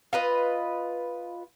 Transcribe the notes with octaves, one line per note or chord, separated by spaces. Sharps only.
F4 B4 D#5